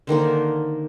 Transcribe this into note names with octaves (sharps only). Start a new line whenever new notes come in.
D3 D#3 A#3 C5